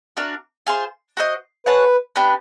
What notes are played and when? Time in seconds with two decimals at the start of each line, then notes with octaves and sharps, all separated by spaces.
0.17 D4 F#4 A#4
0.67 F4 G#4 C5
1.17 F#4 A4 C5 D#5
1.66 G#4 B4 C#5 F#5 A5
2.16 B3 D4 G4 B4